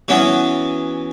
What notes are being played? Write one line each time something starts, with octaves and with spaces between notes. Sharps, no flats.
E3 F#3 B3 C#4